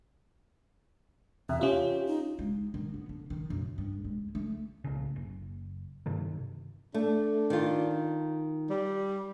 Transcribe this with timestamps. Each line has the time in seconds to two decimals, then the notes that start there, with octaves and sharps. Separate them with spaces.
1.49 E2 C3 E5
1.61 C#4 F4 G4
2.07 D#4
2.39 G#3
2.74 D#3
2.94 B3
3.09 D3
3.30 D#3
3.50 F#2
3.78 G2
4.05 G#3
4.35 A3
4.84 D1 C2 C#3
5.16 F#1
6.06 G2 C3 D#3
6.94 A3 D4
7.50 D#3 F4
8.70 G3